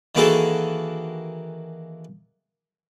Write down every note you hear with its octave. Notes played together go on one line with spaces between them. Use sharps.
D#3 E3 A#3 F#4 G#4 A4